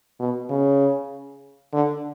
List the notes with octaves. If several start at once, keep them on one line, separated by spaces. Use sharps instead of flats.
B2
C#3
D3